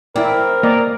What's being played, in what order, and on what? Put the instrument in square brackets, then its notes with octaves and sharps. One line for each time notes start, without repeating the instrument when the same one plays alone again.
[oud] C4 [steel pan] E4 D5 [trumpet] A#4
[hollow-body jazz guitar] A#3 [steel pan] D5 D#5 A#5